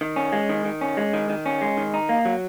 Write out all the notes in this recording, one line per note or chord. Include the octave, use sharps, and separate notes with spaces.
D#3
C#4
G#3
D#3
D#3
C#4
G#3
D#3
D#3
C#4
G#3
D#3
D#4
A#3
F#3